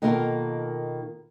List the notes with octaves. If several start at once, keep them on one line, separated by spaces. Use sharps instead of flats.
B2 D#3 A#3 F4 A4 A#4